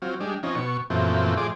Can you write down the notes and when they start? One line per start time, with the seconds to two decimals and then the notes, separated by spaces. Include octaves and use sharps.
0.02 F#3 C4 F4
0.20 G3 G#3 D4
0.43 F3 C4 C#4 D#4
0.55 B2 C#6
0.90 F#2 A#2 E3 F3 A3 C4
1.37 A2 F3 G#4 D5 C6 D6